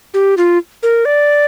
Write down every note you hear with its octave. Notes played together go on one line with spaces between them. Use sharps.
G4
F4
A#4
D5